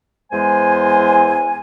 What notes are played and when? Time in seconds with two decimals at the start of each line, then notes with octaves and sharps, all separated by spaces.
0.32 E2 G#3 C5 G#5